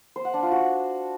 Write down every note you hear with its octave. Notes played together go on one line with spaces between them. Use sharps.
C5
F#5
D4
F4
F#4